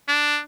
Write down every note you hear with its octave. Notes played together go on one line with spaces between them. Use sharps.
D4